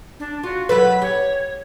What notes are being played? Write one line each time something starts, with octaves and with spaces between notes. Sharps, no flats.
D4
F4 F#4
F#3 A4 B4 B5
G4 C#5